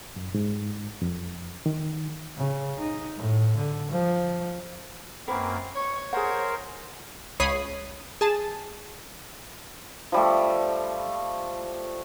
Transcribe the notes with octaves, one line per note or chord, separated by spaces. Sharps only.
F#2
G#2
F2
D#3
C#3
D#4
A2
D3
F3
F#2 A#3 C4 B4
C#5 C#6
G#4 A#4 C5 F#5
C#2 C#5 B5 D#6 C7 D#7
G#4 A5
F3 G3 A3